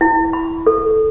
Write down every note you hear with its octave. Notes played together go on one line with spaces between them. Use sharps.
E4
B5
A4